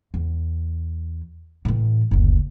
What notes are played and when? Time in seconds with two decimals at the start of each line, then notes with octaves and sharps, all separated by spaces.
0.14 E2
1.65 A2 E3
2.11 F#1 D2